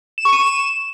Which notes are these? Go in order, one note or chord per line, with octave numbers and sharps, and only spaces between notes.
E7
C#6
D#7
E7